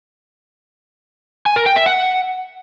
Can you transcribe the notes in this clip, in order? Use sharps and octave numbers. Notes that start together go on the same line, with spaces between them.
G#5
A#4
G5
E5
F#5